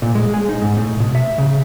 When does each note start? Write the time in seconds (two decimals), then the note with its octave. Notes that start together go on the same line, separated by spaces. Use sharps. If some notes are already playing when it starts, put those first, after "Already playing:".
0.02 A#2
0.15 G#3
0.34 G#4
0.49 D#4
0.62 G#2
0.77 A2
1.00 B2
1.15 E5
1.38 C#3